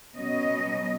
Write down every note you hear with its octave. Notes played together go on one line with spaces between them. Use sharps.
B2 F#3 C#4 D#5